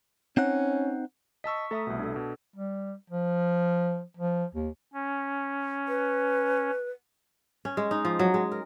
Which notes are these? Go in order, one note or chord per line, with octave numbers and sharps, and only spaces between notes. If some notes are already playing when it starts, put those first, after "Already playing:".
C4 C#4 D#4 F#5
D#5 A5 C#6 E6 B6
A3 A4 E5 A#5 D#6
C2 B2
D4 A4
B2
G3
F3
F3
D#2
C#4
B4
C#4
G#3
D#4
F3
F#3
G#3
A#4